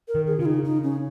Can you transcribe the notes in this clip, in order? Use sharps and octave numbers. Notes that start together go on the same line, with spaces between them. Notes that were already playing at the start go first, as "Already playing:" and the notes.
A#4
D#3
G#4
C#3 F4
D#4
D#4
C#4